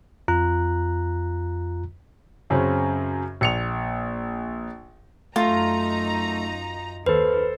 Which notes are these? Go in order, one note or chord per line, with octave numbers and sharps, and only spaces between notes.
F2 F4 A#5 F#6
F#2 C#3 C4 C#4
A#1 C#7 F7
F#2 A3 D#4 F4 A#5
D#2 A4 B4 C5